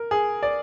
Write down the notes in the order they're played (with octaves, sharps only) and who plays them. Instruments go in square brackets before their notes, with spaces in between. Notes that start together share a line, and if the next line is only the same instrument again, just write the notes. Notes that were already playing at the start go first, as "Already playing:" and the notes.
Already playing: [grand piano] A#4
G#4
D5